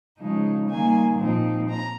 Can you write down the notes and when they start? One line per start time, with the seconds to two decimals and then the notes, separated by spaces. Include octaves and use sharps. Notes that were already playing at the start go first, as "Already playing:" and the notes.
0.18 C#3 F3 G#3 D#4
0.68 D#3 G3 A#3 G#5
1.19 A#2 F3 C4 D#4
1.69 A#5